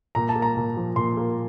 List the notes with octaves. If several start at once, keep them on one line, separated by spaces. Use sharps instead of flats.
A#2 A#5
A5
A#3
A#5
A#2
F3
A#2 C6
A#3